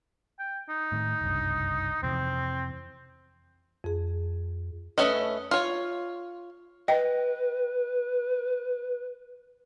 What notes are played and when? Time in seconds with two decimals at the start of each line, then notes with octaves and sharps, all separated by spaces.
0.39 G5
0.70 D#4
0.92 A2 D#3
1.22 F#1 C2 G2
2.03 F2 C3 E3 C4
3.84 F2 G#4
4.98 A3 C#4 B4 D#5
5.51 F4 C#5
6.88 B4 D#5 G5